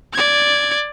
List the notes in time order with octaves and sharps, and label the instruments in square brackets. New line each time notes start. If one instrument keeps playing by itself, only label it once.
[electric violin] D5 G#6